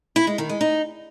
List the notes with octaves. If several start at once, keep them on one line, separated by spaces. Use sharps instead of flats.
E4
G#3
D#3
G#3
D#4